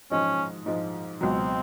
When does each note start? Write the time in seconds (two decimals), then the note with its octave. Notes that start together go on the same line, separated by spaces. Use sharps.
0.11 G#2 F3 G#3 C#4
0.66 G#2 F3 G#3
1.21 C#2 B2 F#3 C4